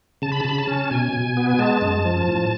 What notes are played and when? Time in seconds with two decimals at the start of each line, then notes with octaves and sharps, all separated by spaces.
0.22 C#3 A5
0.32 B5
0.40 A5
0.45 C#3 B5
0.58 A5
0.68 C#4
0.91 B2 G#5
1.13 B2
1.37 B3
1.50 G#5
1.59 G#3 A5
1.81 F#2
2.05 F3
2.28 A2